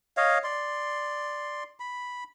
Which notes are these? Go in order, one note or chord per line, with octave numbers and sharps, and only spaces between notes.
C#5 D#5 F5
D5 C6
B5